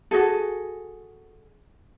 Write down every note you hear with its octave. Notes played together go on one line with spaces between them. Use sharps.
F#4 G#4 A4